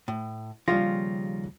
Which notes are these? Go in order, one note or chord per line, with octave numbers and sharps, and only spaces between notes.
A2
D#2 C#3 F3 G3 F4 A#6